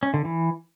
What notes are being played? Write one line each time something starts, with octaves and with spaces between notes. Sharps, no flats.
C#4
D3
E3